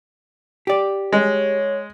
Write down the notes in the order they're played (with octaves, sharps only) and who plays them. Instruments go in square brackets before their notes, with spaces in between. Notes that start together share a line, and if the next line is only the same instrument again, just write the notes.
[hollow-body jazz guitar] G4 D5
[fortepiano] G#3 [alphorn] C#5